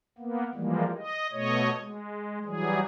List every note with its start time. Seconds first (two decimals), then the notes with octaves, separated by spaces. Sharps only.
0.18 A#3 B3
0.55 E3 F3 G3 G#3 A#3
0.98 D#5
1.32 B2 A3 C#5 D#5
1.80 G#3
2.45 E3 F#3 G3 G#4